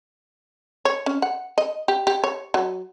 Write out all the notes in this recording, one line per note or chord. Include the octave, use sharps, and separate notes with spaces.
C#5
C#4
F#5
D#5
G4
G4
C#5
F#3